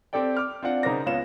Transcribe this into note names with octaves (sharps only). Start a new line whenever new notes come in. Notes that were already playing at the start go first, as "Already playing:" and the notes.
C4 G4 A4 D5 G5
D6 F6
C4 D4 F4 D5 F#5
C#3 D#4 A#4 C5 D6 A#6
C#2 B3 F4 C#5 E7